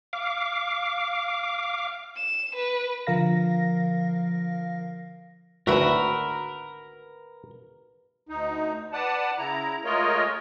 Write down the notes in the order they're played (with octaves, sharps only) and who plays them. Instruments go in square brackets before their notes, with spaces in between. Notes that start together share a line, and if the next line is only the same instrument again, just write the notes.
[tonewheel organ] F5 D6
[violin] E7
B4
[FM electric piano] D3 F3 A#4 F5 A#6
[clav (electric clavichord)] G#1 D2 A2 [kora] F#4 [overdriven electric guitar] A#4 [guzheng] B4 E5
[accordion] D2 D#4
B4 D5 F#5 A5
C#3 E4 A#5
G#3 A3 F4 A#4 C#5 D#5